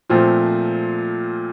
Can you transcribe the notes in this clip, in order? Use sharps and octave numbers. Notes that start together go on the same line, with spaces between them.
A#2 F3 A3 C4 F4